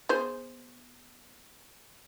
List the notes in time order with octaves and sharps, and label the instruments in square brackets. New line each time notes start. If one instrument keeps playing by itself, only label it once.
[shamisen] B3 G#4 C5